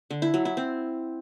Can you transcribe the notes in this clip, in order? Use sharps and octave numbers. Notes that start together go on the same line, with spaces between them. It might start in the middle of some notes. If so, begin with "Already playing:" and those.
D3
E4
F#3
E4
C4